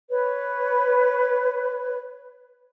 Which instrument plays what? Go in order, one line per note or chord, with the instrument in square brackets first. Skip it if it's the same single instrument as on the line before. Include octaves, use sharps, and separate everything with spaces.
[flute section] B4 C#5